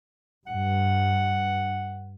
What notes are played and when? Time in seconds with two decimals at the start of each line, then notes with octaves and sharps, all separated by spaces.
0.47 G2 F#5